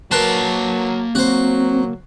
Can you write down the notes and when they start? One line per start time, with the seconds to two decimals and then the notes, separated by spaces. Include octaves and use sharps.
0.11 F#3 A#3 A#4 B4 A5 C6
1.15 F#3 C4 F#4 C5